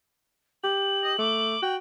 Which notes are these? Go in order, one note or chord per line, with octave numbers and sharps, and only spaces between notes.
G4 F#7
D#5
A3 D6
F#4 G5